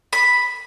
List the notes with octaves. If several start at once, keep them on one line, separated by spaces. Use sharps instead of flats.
B5